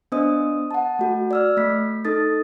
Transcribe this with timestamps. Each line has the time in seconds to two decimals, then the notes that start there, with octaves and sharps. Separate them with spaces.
0.12 B3 D4 C5 D#5 D#6
0.71 F#5 A5
0.99 A3 F#4
1.31 D5 E6 F6
1.57 A3 B6
2.05 D#4 A4 D#6 A6